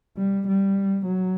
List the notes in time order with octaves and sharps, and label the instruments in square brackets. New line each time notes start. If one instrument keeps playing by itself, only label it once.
[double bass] G3
G3
F#3